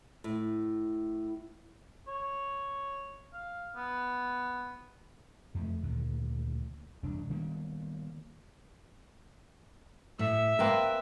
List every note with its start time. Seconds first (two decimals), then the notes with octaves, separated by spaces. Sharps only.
0.24 A2
2.08 C#5
3.33 F5
3.75 B3
5.55 F2 F3 G3 A3
5.83 D2 A#2 D#3
7.03 E1 C2 F#2 D4
7.30 D#3 G3 A#3 B3
10.19 A2 E5
10.59 A#3 C4 A#4 B4 G#5